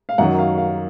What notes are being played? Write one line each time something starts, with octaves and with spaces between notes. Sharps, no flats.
F5
F#2 D#3 F#3 F#5
F5
F5